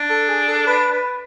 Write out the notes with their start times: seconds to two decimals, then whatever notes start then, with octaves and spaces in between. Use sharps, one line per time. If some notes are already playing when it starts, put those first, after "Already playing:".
Already playing: D4
0.10 A4
0.28 G#4
0.48 A4
0.67 B4
0.93 B4